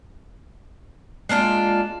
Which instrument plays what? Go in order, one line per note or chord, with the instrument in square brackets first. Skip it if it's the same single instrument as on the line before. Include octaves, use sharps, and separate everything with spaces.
[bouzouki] G#3 A#3 D4 F4